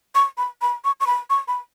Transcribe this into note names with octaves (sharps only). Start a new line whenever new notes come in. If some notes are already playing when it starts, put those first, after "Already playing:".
C#6
B5
B5
C#6
C#6
B5
C#6
B5